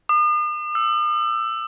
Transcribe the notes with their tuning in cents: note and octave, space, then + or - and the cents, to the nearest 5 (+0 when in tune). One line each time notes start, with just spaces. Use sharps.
D#6 -45
E6 +15